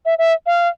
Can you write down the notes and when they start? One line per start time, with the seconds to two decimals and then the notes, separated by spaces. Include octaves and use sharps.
0.06 E5
0.19 E5
0.46 F5